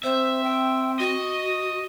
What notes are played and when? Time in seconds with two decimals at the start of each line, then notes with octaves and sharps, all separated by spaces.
0.03 C4 C5 E5
0.44 G5
0.99 F#4 D#5